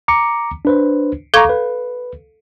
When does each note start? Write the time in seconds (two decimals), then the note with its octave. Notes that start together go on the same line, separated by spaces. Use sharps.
0.08 A#5 D6 C#7
0.65 D4 B4 C5
1.34 A4 F5 A#5 C#6 D6 G#6
1.49 B4